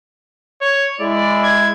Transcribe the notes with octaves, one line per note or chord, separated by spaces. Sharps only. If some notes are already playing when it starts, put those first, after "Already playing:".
C#5
G#3 E4 D5
G#6